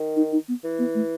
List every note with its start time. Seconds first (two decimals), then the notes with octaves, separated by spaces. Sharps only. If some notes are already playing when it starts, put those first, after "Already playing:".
Already playing: D#3
0.16 D#4
0.32 D#4
0.48 B3
0.64 E3
0.79 B3
0.95 A3